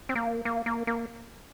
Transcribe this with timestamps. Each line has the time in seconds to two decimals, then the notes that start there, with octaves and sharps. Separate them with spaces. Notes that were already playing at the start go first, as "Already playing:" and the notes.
0.09 C4
0.15 A#3
0.45 A#3
0.66 A#3
0.87 A#3